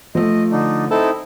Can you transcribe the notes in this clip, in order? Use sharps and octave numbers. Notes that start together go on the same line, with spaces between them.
F3 A3 D#5
D3 D4 D#4
C4 D#4 E4 A4